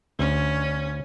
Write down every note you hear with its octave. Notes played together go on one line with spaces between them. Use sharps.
D2 C#4